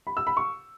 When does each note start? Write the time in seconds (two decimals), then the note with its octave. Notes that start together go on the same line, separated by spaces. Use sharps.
0.07 B5
0.17 E6
0.27 B5
0.37 C#6